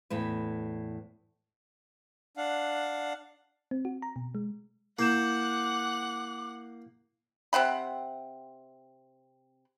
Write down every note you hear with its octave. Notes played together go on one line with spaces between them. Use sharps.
E2 A2 B4
D4 F5 F#5
C4
F#4
A#5
B2
G#3
A#3 E4 F#5 D6 F#6 G6 E7
C3 C4 F#5 B5